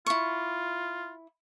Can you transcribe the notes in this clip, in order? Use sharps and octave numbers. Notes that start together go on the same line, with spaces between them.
E4 F4 C#6